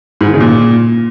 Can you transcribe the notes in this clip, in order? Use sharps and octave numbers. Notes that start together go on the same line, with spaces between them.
G#2
D#3
C#3
A#2